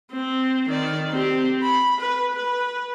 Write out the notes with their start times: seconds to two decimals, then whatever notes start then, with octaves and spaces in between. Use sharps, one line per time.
0.12 C4
0.69 D#3 D5
1.11 C4 G4
1.63 B5
2.01 B4
2.35 B4